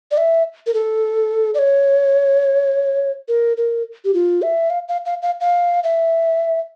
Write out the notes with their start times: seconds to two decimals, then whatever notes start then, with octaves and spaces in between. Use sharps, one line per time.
0.11 D5
0.17 E5
0.67 A#4
0.74 A4
1.54 D5
1.59 C#5
3.28 A#4
3.57 A#4
4.05 G4
4.14 F4
4.42 E5
4.70 F5
4.88 F5
5.06 F5
5.22 F5
5.41 F5
5.84 E5